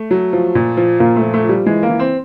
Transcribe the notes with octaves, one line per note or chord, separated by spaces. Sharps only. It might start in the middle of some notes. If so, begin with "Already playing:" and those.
Already playing: A3
F#3
F3
A#2
F3
A#2 A#3
A3
F3
A3
F3
G3
E3 G#3
A#3
E3
C4